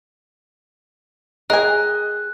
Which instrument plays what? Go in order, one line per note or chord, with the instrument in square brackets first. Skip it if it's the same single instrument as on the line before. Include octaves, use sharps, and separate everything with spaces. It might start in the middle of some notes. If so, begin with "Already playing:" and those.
[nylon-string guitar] G#4 G5 [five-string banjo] A#4 G#5 [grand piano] D#5 [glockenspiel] F#6